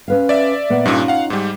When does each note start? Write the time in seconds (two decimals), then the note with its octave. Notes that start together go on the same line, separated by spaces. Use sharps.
0.08 C#4 B4 F5
0.29 D5 E5
0.70 A#2 B3 F#5
0.86 G2 A#2 C#4 D#4 F4
1.08 F5 F#5
1.30 G#2 G3